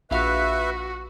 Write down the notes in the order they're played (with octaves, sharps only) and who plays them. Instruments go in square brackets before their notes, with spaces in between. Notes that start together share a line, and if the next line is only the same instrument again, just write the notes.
[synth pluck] A#1 F5 [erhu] F#4 [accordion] B4 E5